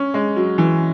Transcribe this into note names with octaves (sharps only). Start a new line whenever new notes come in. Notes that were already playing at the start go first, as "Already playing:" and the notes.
Already playing: C#4
G#3
F#3
E3